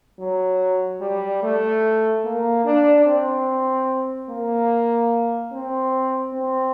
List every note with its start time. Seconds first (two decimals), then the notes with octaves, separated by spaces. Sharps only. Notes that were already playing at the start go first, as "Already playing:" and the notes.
0.19 F#3
1.01 G3
1.43 A3
2.25 A#3
2.65 D4
3.06 C4
4.29 A#3
5.52 C4
6.33 C4